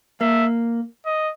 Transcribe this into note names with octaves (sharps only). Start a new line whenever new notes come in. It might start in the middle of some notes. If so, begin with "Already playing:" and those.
A#3 E5
D#5